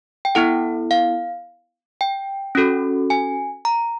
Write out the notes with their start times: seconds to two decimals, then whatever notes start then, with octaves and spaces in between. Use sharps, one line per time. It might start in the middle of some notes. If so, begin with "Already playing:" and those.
0.25 G5
0.35 B3 E4 A4 F#5
0.91 F5
2.01 G5
2.55 C#4 F#4 A4
3.10 G#5
3.65 A#5